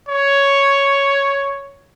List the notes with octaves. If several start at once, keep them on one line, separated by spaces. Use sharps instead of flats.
C#5